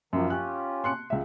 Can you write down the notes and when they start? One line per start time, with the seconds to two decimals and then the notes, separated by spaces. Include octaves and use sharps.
0.13 F#2 D#3 F3 A#3
0.30 C#4 F4 G4 F#6
0.84 C6 F#6 C#7
1.10 C#2 E5